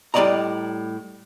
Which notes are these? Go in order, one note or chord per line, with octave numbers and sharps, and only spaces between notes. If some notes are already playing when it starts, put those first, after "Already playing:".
A2 G3 C#4 D5 D#5 A#5